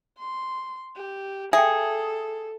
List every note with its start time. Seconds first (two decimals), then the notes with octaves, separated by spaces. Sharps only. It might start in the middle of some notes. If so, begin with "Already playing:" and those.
0.18 C6
0.96 G4
1.53 G#4 A4 E5 G5